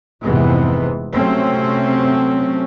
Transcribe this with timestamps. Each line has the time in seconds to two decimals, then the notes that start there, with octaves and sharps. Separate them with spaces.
0.23 F1 F2 G#2 C3 E3 B3
1.13 C3 F#3 A3 C4 C#4